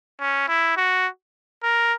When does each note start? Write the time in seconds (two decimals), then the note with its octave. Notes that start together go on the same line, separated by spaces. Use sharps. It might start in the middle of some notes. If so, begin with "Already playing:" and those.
0.20 C#4
0.48 E4
0.77 F#4
1.63 A#4